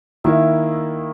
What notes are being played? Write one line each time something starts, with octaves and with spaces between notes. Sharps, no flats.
D#3 A#3 E4 E5